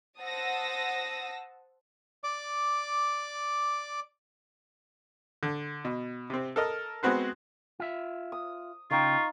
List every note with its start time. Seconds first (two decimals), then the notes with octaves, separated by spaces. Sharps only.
0.19 C5 F#5 A5 D#6 E6 A#6
2.24 D5 D6
5.43 D3
5.85 B2
6.30 C3 C4
6.56 A4 A#4 D#5 F6
7.03 G#3 B3 C4 F#4 B4 C5
7.80 F4 E5
8.32 D#6
8.91 C#3 D#4 F4 F5 G5 C#6 D6